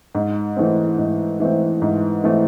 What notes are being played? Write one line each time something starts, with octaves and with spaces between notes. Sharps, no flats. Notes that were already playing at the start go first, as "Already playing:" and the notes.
G#2
E3 A3 C4
G#2
E3 A3 C4
G#2
E3 A3 C4